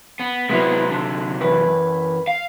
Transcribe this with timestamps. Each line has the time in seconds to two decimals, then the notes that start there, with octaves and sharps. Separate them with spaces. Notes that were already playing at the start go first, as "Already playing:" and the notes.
0.19 B3
0.50 C3 F#3 G#3 B3 E4
0.91 D3
1.41 F#2 E3 B4
2.27 F5